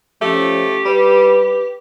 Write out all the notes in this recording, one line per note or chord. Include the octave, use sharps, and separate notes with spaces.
F3 A3 C#4 G4
G3 B4